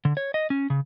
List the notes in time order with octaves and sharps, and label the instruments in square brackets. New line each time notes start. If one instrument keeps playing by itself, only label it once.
[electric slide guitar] D3
C#5
D#5
C#4
C#3